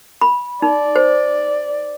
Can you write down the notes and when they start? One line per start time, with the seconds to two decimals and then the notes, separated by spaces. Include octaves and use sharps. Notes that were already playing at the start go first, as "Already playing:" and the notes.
0.21 B5
0.62 D#4 D5
0.96 C5